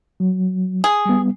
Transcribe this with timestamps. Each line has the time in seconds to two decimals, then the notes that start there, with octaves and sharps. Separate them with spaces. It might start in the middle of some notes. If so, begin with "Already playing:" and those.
0.20 F#3
0.84 G#4
1.05 G3 B3